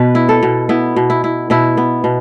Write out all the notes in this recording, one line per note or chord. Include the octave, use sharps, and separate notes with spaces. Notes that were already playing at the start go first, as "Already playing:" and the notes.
Already playing: B2 B3 B4
E4
A4
B2
B3 E4
B2
E4
E4
B2 E4
B3
B2